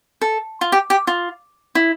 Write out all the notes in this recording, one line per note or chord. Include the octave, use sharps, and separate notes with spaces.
A4
F4
G4
G4
F4
E4